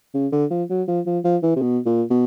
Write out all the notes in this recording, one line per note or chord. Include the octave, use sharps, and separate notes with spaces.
C#3
D3
F3
F#3
F3
F3
F3
E3
C3
B2
A#2
B2